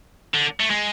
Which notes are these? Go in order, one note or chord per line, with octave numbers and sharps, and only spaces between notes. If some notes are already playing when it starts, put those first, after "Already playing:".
D3
A3
G#3